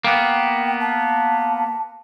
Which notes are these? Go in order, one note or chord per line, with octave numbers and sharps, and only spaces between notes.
A#3 B3 G5
A5